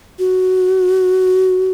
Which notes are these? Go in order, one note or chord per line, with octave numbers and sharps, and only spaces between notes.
F#4